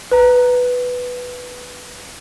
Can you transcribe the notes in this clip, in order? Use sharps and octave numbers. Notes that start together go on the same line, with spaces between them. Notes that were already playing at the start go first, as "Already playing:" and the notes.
B4 A#5